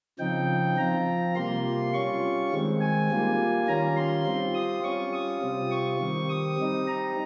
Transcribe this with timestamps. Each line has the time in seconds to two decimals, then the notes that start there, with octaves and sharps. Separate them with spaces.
0.19 C#3 F3 C4 D#4 G5
0.77 F3 C4 F4 A#5
1.35 C3 G3 A#3 F4 C6
1.93 G3 C#4 F4 C#6
2.52 D#3 G#3 C4
2.81 G#5
3.10 G3 A#3 F4
3.67 D#3 G3 C#4 F4 A#5
3.96 C6
4.26 G3 C4 F4
4.55 D#6
4.84 G3 C#4 F4 C#6
5.13 D#6
5.42 C3 G3 C4 F4
5.71 C#6
6.00 D#3 G3 C4
6.29 D#6
6.58 G3 C4 D#4
6.87 A#5